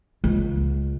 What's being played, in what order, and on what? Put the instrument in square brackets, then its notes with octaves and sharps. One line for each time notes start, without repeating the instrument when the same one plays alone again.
[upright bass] C#2